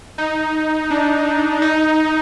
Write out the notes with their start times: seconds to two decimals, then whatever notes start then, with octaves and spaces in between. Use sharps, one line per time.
0.18 D#4
0.91 D4
1.62 D#4